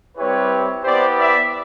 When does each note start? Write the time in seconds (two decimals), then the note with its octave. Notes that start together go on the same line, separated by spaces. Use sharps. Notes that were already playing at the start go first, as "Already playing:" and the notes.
0.18 G3 C4 E4 G4 B4 C#5
0.83 B3 E4 G4 C5 D5
1.17 D5 E5